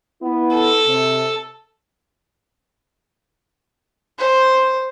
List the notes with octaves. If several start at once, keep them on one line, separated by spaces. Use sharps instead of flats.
B3 E4
A4
C3
C5